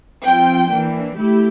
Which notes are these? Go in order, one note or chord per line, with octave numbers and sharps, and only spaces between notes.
F3 C4 F4 G5
E3 A#3 D4
A3 E4 G4